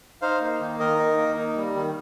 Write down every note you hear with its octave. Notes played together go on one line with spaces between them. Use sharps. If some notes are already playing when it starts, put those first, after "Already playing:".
D#4 C5 F5
A#3
D#3
D#3 A#4 D#5
D#4
A#3
D#4
G3
D#3